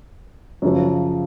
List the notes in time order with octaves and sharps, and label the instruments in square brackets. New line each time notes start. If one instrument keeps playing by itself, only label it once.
[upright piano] F#2 C#3 F3